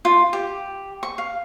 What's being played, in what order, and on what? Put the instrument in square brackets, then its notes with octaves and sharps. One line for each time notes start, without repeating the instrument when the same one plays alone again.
[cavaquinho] F4
G4
C#6
F5